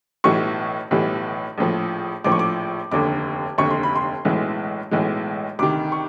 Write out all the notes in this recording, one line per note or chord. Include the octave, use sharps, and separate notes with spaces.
B1 A2 E3 G3 C#6
B1 A2 E3 G3
A#1 A2 F3
A#1 A2 F3 D6
C#6
D6
F1 D#2 D3 D6
F1 D#2 D3 C#6
C6
B5
C6
B1 A2 E3 G#3
B1 A2 E3 G#3
D2 C3 D#3 D6
C#6